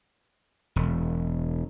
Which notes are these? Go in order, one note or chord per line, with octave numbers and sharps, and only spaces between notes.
E1